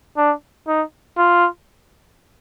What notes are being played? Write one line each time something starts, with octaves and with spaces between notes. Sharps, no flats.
D4
D#4
F4